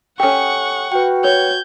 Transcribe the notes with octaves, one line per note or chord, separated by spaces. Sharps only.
C#4 G4 A4 F#5 G5 C#6
F#4 B4 G5
C#5 G6 G#6